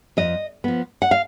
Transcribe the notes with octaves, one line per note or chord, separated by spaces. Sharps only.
F2 D#5
F3 B3
F#5
F5